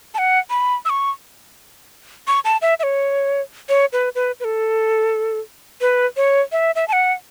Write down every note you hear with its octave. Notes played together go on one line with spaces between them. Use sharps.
A5
F#5
B5
E6
C#6
C#6
A5
E5
E5
C#5
C#5
B4
B4
B4
A4
B4
C#5
E5
E5
A5
F#5